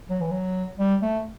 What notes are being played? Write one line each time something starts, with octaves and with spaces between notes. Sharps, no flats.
F#3
E3
F#3
G3
A3